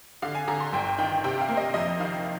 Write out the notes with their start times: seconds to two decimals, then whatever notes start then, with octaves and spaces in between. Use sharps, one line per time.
0.22 D3 F5
0.35 G#5
0.48 D3 A#5
0.60 C6
0.73 G1 G5
0.98 D#3 G5
1.24 C3 G5
1.41 F5
1.49 A#3
1.57 D#5
1.74 F2 D#5
2.00 D#3 F5